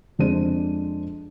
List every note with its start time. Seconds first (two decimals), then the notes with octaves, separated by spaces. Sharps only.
0.19 F2 G#3 D4 C5 D#7